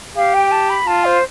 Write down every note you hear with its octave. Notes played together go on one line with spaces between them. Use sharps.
G4 F5
G5
A5
B5
F4 A5
C5